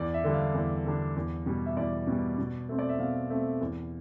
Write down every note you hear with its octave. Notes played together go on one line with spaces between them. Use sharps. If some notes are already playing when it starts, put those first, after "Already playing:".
Already playing: E2 D5
E5
D3 G3 D4
F5
E2
D3 G3 D4
E2
B2 G3
E5
E2 D5
B2 G3
B2
A3 C4
D5
E5
B2 F5
A3 C4
E2